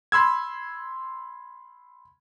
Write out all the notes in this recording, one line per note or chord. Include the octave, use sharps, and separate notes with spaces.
B5 C6 E6 G#6